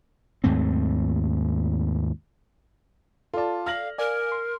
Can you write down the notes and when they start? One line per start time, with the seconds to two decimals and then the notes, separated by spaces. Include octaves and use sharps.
0.44 D#2 G#2 A3 C4
3.33 F4 A4 D5 A5
3.67 F5 F6 A#6 F#7
3.98 A#4 D5 F5 G#5
4.32 C6